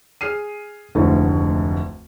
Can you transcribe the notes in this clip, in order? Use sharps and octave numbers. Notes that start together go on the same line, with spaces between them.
G#4 F6 C7 D#7
F1 D2 G#2 D3 E3